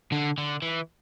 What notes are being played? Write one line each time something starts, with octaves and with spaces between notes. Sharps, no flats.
D3
D3
E3